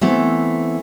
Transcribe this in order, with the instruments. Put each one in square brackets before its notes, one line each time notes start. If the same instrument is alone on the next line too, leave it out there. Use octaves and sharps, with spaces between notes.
[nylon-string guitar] E3 A3 B3 C4